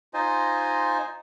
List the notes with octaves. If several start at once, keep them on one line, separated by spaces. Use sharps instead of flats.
D#4 F4 C5 D#5 G#5